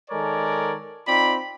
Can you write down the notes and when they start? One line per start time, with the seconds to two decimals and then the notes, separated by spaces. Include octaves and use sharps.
0.11 D#3 G#3 A4 A#4 C#5 D5
1.08 C4 D#4 F4 D5 B5